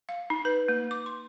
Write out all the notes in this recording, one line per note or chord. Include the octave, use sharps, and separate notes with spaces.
F5
D#4
B4
A#3
D6
C6